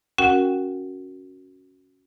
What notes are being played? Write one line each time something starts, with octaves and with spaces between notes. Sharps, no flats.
C#4 F#4 A#4 F#5 G5